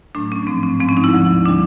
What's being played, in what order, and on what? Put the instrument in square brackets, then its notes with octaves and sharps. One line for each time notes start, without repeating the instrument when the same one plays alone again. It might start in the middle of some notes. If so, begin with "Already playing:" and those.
[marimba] A2 F#3 A3 D4
C#4
G#2 F3 A3 C4
C#4
G#2 F3 G#3 C4
C#4
D#4
E4
D2 D3 F3
D3 G3 D4